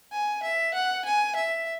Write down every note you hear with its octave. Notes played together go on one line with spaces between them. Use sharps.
G#5
E5
F#5
G#5
E5